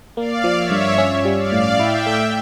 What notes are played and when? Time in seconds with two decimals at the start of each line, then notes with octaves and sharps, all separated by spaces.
0.17 A#3 D5 F5
0.44 F3
0.58 C#5 E5
0.71 G2
0.98 C#4
1.25 G3
1.39 D5 F5
1.52 A2
1.79 E4 E5 G5
2.06 A3